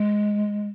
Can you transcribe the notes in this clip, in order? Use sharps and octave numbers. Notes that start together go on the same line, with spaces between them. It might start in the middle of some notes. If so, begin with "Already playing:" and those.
Already playing: G#3